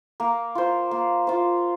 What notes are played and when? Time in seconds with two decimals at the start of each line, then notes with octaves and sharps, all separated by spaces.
0.20 A#3
0.55 F4 C5
0.91 A#3
1.27 F4 C5